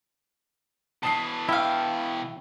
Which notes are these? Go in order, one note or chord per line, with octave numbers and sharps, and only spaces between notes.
B2 E3 A5 D#6 C7
E4 G4 F5